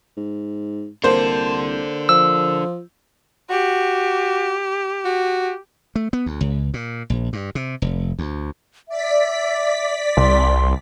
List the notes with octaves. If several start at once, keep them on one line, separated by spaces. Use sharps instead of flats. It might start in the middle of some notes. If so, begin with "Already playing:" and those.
G#2
C2 A#3 D4 A4 C5
F3 E6
F#4 G4
F#4
A3
B3
D2
C#2
A#2
A#1
G2
C3
F1
D2
D5 E5 B6
C2 C6